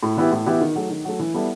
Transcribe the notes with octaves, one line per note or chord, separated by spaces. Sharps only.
A2
E3 B3 E4 G4
A2
E3 B3 E4 G4
D#3
F#3 A3
D#3
F#3 A3
E3
G3 B3 E4 A4